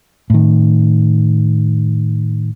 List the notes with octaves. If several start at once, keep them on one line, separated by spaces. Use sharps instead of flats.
A2 D#3